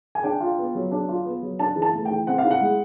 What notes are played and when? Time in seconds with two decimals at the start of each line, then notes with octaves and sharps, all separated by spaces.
0.15 G#5
0.23 D4 G5
0.40 F4
0.58 B3
0.75 F#3
0.92 D4
1.09 F4
1.25 B3
1.42 F#3
1.59 D4 A5
1.76 E3
1.82 A5
1.93 A3
2.05 G5
2.10 E3
2.27 C4 F#5
2.38 F5
2.45 E4
2.51 F#5
2.61 G#3